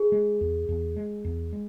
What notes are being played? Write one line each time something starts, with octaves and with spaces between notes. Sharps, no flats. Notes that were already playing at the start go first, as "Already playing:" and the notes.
Already playing: G#4
G#3
E2
E2
G#3
E2
G#3